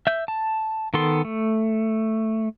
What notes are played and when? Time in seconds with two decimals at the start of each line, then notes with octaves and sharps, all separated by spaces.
0.07 E5 G6
0.28 A5
0.94 D#3 B3 A4 C6
1.25 A3